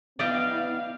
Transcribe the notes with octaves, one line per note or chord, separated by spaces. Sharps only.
B3 E4 D5 D#5 F5 G5